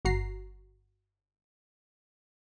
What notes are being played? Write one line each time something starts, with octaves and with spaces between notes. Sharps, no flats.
G1 F#4 A#5 C7